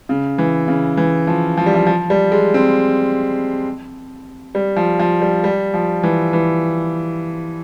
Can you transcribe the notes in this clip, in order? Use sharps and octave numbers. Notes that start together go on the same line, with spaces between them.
C#3
E3
C#3
E3
F3
F3
G3
F3
F3
G3
G#3
C4
G3
F3
F3
G3
G3
F3
E3
E3